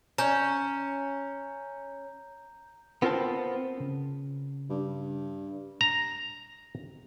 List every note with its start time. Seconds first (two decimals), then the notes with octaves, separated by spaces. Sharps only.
0.18 C#4 A#5 G6
3.02 B3 C4 F4 A#4 C5 A5
3.78 C#3 C#4
4.70 G2
5.81 A#5